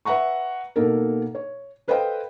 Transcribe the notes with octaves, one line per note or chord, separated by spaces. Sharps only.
B4 E5 F#5 A#5 C#6
B2 A#3 D#4 A4 A#4
C#5
A4 B4 C5 D#5 F5 G5